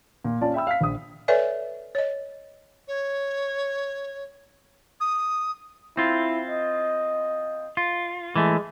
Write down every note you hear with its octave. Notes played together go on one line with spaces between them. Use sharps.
A#2
C#4 F4 D5 A5
E5 G5 B5 E6
F5 B6
A#1 D#6
A4 B4 C#5 D5 E5 G#5
C#5 D#5
C#5
D#6
C4 E4 F4
D#5
F4
E3 G#3 A3